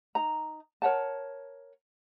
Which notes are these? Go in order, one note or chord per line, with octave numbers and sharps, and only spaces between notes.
D#4 A#5
A#4 C#5 F#5 A5